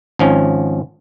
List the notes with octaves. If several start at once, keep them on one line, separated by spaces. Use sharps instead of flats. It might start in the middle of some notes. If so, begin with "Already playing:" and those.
G#1 F3 C#4